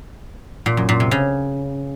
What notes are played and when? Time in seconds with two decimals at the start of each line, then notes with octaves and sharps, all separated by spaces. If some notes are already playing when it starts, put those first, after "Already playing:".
0.66 A#2
0.77 F#2
0.89 A#2
1.00 C3
1.11 C#3